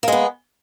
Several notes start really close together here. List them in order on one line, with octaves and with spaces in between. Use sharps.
A#3 G#3 B3